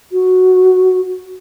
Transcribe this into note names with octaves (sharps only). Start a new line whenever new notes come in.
F#4